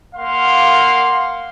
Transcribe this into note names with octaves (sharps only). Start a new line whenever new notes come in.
A#3 F5 F#5 C6